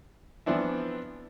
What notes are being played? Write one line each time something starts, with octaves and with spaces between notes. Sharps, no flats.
E3 F3 B3 C4 D4 E4